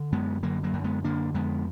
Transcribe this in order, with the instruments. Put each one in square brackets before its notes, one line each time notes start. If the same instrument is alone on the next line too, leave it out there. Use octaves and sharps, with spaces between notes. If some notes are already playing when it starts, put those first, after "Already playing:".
Already playing: [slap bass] D3
F#2 G#3 B3
D3 F#3 A#3
F#3 A#3
F#2
G#3 B3
D3 A#3 D4
F2 G#3 B3